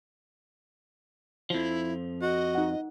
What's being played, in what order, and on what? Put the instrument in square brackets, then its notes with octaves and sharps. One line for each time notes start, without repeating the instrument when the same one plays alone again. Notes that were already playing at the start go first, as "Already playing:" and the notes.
[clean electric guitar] F2 F3 [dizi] E4
[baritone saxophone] F#4 [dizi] D#5
[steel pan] D#4 F#5